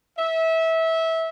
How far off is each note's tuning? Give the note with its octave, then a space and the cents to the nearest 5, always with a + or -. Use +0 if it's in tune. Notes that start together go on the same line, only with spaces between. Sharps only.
E5 -20